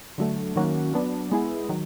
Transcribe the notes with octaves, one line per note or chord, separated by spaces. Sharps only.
D3 F#3 A3
D#3 F#3 A#3 C#4 F#4
F#3 B3 D4
G#3 B3 E4 G#4
D#3 F#3